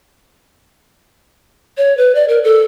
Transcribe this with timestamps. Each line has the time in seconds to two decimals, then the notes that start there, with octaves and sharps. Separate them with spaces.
1.77 C#5
1.97 B4
2.15 D5
2.28 A#4
2.44 A4